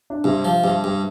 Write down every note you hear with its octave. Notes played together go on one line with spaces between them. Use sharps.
D4
G2 C3 C4
F3
G2
G2